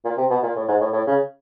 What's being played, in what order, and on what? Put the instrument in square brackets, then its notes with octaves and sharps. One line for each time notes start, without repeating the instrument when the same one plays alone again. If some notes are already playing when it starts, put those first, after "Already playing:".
[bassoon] A#2
C3
B2
A#2
A2
G#2
A2
A2
C#3